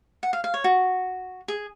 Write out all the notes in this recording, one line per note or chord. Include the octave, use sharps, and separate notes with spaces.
F#5
F5
F5
C#5
F#4
G#4